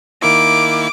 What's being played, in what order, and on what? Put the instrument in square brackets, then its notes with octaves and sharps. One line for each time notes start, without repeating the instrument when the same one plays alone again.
[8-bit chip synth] D#3 A#3 E4 [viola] D6